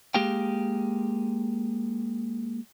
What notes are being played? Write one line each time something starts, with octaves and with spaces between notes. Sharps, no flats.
G#3 A#3 G4 G#4 F5 G5